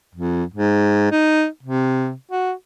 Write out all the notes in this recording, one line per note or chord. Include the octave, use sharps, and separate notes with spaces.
F2
G#2
D#4
C3
F#4